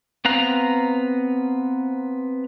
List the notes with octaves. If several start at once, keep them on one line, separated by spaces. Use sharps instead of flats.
B3 C4 F5 A#5 F#6